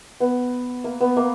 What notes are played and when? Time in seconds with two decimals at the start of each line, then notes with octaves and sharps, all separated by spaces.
0.20 B3
0.84 A#3
1.01 B3
1.17 A#3